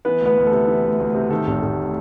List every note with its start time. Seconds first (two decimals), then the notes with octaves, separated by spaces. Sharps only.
0.05 E3 B3 B4
0.21 D2 B3 B4
0.37 D2
0.47 A4
0.52 C3
0.68 E3
0.84 D2
1.00 D2
1.14 C3
1.30 D#3 A4
1.47 F1
1.62 F1